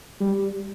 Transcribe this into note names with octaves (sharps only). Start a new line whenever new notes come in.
G3